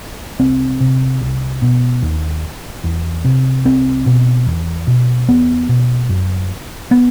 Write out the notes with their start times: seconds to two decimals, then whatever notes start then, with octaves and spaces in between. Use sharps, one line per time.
0.39 C2 C4
0.80 C3
1.21 C2
1.62 B2
2.02 D#2
2.84 E2
3.25 C3
3.65 C2 C4
4.06 B2
4.46 E2
4.87 B2
5.28 E2 B3
5.69 B2
6.09 F#2
6.91 B3